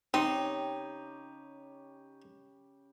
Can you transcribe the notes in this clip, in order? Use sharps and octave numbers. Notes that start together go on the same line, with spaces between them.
C#3 C4 D#4 G4 C#5